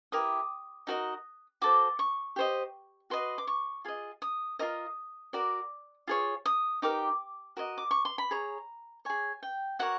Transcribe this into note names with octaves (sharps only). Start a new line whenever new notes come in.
E4 G4 A#4 D#6
D#4 F#4 A#4 D#5
F#4 A4 C5 D6
C#6
G4 C5 D#5
F#4 B4 D#5 C6
D6
C#6
F4 G#4 D#5
D#6
F4 A#4 D#5 D#6
F#4 A#4 D5
F4 G#4 C#5
D#6
D#4 G4 A#4 D6
F#4 A#4 D#5
D6
C#6
C6
B5
G#4 C#5 A#5
G#4 C#5 G#5
G5
F#4 A#4 C#5 F#5